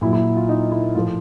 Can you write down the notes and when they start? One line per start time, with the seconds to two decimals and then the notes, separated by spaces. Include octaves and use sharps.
0.01 A#2 F#3 E4
0.13 E4
0.37 F4
0.49 D#4
0.72 E4
0.95 A2 F3 F4